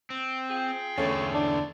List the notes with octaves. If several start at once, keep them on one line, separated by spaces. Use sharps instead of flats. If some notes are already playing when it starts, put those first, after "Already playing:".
C4
F4 G#4 G5
E2 D3 A3 C#4
D4